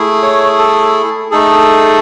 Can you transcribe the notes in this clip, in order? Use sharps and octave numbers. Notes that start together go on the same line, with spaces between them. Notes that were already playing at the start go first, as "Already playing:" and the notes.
Already playing: A3 E4 G#4
C#5
A4
A3 D#4 G#4 A4